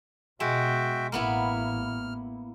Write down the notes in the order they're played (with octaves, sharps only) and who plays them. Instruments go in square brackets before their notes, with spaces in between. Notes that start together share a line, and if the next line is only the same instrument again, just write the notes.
[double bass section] B2 [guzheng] G#3 [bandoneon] F#4 E5 G5
[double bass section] A1 [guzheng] A#3 B3 E4 [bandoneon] F6